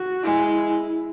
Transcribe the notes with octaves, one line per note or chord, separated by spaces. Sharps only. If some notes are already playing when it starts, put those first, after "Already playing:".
Already playing: F#4
G#3 E4